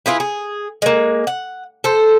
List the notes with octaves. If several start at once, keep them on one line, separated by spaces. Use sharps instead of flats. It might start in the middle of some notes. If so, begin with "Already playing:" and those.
E4 F4 G#4 B4
G#4
G#3 A#3
F#5
A4 C5